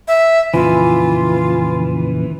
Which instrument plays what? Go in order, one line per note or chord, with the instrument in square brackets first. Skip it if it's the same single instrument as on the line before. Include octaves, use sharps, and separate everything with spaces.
[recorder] E5
[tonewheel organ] F2 A#2 C#3 [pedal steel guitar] E3 [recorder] F4